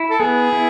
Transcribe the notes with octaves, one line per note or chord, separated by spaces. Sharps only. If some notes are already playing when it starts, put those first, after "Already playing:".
Already playing: E4
A4
B3 G#4
E4